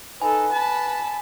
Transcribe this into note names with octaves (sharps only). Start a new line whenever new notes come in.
D#4 A4 B4 G#5
A5 B5